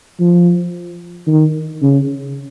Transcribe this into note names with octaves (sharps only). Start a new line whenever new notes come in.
F3
D#3
C#3